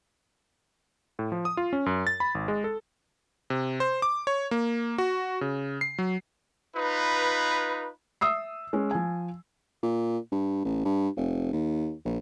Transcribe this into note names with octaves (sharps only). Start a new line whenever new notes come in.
A2
F3
D#6
F4
C#4
F#2
A6
B5
G#1
G#3
A4
C3
C5
D6
C#5
A#3
F#4
C#3
C7
F#3
D#4 F4 B4
E5 D#6 E6 C7
G#3 C#4
F3 G#5
A#2
G2
A1
G2
F1
D#2
A#1